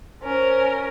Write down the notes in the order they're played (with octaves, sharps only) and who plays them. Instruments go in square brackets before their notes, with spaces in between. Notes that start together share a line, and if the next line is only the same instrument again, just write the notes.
[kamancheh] C#4 A#4 [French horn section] C5